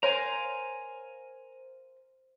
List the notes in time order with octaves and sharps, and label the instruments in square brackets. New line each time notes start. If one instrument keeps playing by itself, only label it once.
[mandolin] A#4 F5 C6 [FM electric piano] C5 [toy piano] C#5 [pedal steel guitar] G#5 A#5